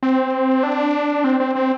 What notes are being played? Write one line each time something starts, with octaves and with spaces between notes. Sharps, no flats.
C4
D4
C4
C4
C4